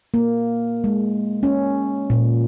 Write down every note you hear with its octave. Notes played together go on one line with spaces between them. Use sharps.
A#3
G#3
C#4
A#2